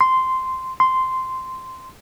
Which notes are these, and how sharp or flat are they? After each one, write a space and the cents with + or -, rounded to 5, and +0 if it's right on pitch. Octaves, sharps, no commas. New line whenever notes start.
C6 -10
C6 -10